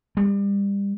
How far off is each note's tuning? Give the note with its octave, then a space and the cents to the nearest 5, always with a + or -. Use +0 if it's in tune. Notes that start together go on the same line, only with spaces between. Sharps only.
G3 +30